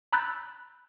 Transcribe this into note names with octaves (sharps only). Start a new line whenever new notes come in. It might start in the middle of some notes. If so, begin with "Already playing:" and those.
A#5 B5 E6 F#6 G6 A6